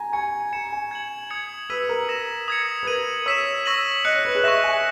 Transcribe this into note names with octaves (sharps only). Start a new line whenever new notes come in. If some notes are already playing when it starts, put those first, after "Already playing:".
Already playing: G#5 A#5
G#5 C#6 G#6 C#7
A#5 G#6 C#7 E7
G#5
G#6 C#7 F#7
D#6 G#6 C#7 F#7
B4 E6 B6 D#7 F#7
A#4
D#6 A#6 E7
D#6 G#6 C#7
B4
A#4 G#6 D#7 F#7
C#5 E6 B6 E7
C#6 E6 A#6 D#7 F#7
D#5 F#6 C#7 F#7
C#5
B4
G#4
E5 C#6 F#6 A#6 E7
G#5